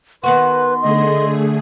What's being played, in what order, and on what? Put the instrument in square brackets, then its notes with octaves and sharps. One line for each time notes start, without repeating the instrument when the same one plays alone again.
[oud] D#3 B3 F#4 [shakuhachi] B4 [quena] C6
[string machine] D3 A3 G#4 [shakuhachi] D#5